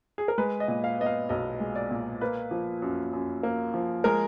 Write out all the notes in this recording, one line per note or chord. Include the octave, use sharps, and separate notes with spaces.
G#4
A#4
G#3 B4
D#5
A#2
F5
B3 D#5
F5
B1 D#5
G#3
D5
A#2
A#3 B4
F3
F#2
F#2
A#3
F3
G#3 A#4